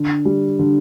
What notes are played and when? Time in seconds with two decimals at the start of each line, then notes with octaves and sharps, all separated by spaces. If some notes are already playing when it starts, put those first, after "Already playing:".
Already playing: D3
0.25 G3
0.59 D3